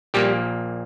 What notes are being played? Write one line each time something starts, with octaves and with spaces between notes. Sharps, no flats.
A#1 A#2 G3 A#3 G4